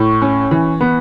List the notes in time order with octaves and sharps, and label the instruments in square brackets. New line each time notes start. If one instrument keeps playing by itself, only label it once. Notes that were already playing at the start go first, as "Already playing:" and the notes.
Already playing: [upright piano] A2 C#6
C#4
E3
B3